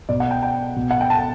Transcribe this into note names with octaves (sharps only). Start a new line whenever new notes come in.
B2 D5
F#5
G5
G5
B2
F#5
G5
A5